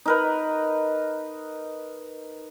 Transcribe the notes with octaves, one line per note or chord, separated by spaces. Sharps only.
D#4 A#4 B4